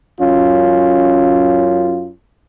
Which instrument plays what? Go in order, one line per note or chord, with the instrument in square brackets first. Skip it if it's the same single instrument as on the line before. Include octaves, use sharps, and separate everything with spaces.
[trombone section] F#2 C#4 F4